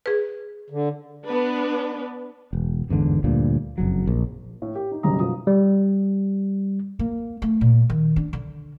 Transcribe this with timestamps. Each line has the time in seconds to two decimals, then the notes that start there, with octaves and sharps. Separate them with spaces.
0.06 G#4 B4
0.70 D3
1.25 B3 D4 B4
2.53 E1
2.89 G1 E2 G#2 D3
3.24 D2 G2 A#2
3.78 F#1 F2 F#3
4.07 A#1
4.62 A2
4.75 G4
4.91 D#4
5.03 F#1 B1 F#2 G3 A#5 D#6
5.20 B2 F3 D#6
5.47 G3
6.99 A#3
7.42 A3
7.61 A#2
7.90 D#3
8.16 D4
8.33 D3